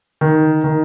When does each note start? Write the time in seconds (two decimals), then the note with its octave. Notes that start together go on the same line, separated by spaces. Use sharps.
0.21 D#3
0.64 D#3